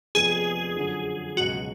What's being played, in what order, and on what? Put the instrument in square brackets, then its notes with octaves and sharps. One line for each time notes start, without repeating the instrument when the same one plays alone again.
[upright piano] F1 F2 F3 B3 [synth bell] G#4
[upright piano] F#2 D3 F3
[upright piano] C#2 B2 F#3 [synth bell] F#4